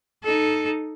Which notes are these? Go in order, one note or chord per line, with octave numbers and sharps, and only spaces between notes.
D#4 A4